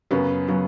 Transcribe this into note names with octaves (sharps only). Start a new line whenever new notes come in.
F#2 C#3 F#3 B3
C#3 F#3 B3